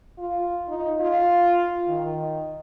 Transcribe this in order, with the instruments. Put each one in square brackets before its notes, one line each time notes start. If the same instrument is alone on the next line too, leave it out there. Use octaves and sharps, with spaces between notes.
[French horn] F4
D#4
F4
D#3